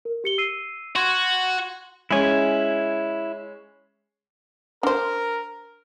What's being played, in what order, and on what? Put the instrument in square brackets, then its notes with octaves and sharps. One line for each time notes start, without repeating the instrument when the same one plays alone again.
[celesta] A#4
G4 C#7 G7
E6 C7 D#7
[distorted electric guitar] F#4 [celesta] C6 G#6
[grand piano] G#3 C#4 [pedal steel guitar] E4 G#5
[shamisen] D4 C5 [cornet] A#4